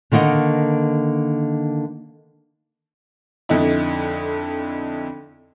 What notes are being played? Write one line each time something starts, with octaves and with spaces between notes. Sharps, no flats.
D3 D#3 A#3 D#5 F#5
F2 D3 D#4 E4